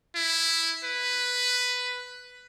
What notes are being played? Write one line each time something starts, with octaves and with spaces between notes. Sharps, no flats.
E4
B4